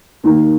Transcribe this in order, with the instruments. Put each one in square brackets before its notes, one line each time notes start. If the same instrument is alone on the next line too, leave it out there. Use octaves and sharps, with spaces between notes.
[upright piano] D#2 D#3 A#3